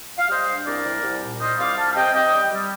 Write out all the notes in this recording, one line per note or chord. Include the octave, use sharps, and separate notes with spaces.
F5
G3 C5 D#5
D4
C2 A#4 D5
C2
C2
A#2
G3 C5 D#5
C2 D5 F5
G3 F5 A5
C3 D#5 G5
C3 D#5 G5
G3
G3